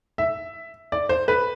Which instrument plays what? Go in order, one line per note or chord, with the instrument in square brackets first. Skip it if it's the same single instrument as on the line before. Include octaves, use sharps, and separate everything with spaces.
[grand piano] E5
D5
C5
B4